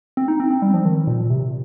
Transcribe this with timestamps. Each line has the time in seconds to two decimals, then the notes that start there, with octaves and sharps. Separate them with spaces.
0.17 C4
0.28 D#4
0.40 C4
0.51 C4
0.62 G3
0.74 F3
0.85 D#3
1.07 A#2
1.20 A#2
1.30 C3